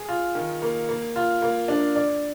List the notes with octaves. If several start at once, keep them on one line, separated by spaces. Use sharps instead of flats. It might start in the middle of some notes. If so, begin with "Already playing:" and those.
Already playing: G#4
F4
D#3
A#3
A#3
F4
A#3
D4
D5